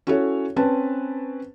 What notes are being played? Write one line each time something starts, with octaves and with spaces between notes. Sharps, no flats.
C#4 E4 F#4 A4 C#5
C4 C#4 B4 A5